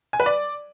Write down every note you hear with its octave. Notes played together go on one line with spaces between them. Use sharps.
G#5
B4
D5